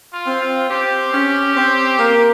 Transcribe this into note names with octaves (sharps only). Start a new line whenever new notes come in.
F4
C4
F4
C4 G4
C#4
C4
A#3